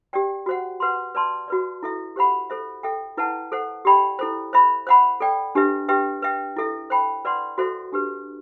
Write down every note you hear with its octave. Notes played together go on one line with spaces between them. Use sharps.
G4 D5 G5
F#4 C5 F#5
B4 F#5 C6
B4 D5 A5 C6
F#4 B4 D5
E4 A4 E5
G4 C5 F#5 B5
A4 C5 E5
A4 E5 G5
E4 B4 F#5 A5
A4 C5 F#5
G4 D5 G5 B5
E4 A4 C5
C5 E5 B5
C5 F#5 B5
A4 D5 G5
D4 G4 B4 E5
G4 B4 E5 G5
B4 E5 G5
E4 A4 E5
C5 G5 B5
B4 D5 F#5 C6
F#4 A4 C5 E5
D4 G4 B4